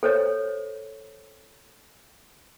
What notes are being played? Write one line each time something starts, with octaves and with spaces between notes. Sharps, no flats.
A4 C5 C#5